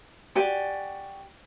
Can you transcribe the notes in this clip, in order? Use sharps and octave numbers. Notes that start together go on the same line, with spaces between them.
F#4 G4 D5 G#5